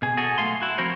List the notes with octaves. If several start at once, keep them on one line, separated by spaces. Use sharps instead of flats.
B2 G#4
F#4 G#4 A4
B1 E3 A3 F5 C6
E4 F#4
F3 C4 F#4 A#4 C5 C#5